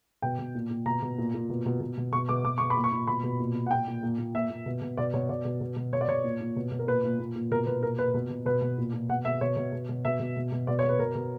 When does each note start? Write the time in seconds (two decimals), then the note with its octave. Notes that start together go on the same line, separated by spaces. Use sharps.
0.22 B2 G5
0.39 B2
0.55 A#2
0.70 A#2
0.86 B2 A#5
1.02 B2
1.18 A#2
1.34 A#2
1.50 B2
1.66 B2
1.80 B2
1.97 B2
2.13 B2 C#6
2.29 B2 D6
2.44 B2 D6
2.58 B2 C#6
2.70 B5
2.76 A#2
2.84 C#6
2.92 A#2
3.07 B2 B5
3.23 B2
3.39 A#2
3.55 A#2
3.66 F#5
3.71 A#2 G5
3.87 A#2
4.03 A#2
4.19 A#2
4.34 A#2 E5
4.50 A#2
4.66 B2
4.82 B2
4.97 B2 D5
5.14 B2 C#5
5.29 B2 D5
5.45 B2
5.61 B2
5.76 B2
5.93 B2 C#5
6.01 D5
6.08 B2 C#5
6.24 A#2
6.41 A#2
6.56 B2
6.72 B2
6.79 A#4
6.87 A#2 B4
7.04 A#2
7.19 A#2
7.36 A#2
7.51 B2 A#4
7.67 B2 B4
7.82 A#2 A#4
7.98 A#2 B4
8.14 B2
8.30 B2
8.46 B2 B4
8.62 B2
8.78 A#2
8.93 A#2
9.09 B2 F#5
9.25 B2 E5
9.41 B2 C#5
9.57 B2
9.73 B2
9.89 B2
10.05 B2 E5
10.20 B2
10.37 B2
10.52 B2
10.67 B2 D5
10.79 C#5
10.84 B2
10.89 B4
10.99 B2 A#4
11.15 B2